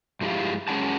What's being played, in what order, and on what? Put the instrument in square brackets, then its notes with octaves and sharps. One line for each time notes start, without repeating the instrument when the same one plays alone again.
[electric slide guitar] G2 F3 G#3 E4 G4 F5
F#2 G#3 C#4 G#4 F#5 A5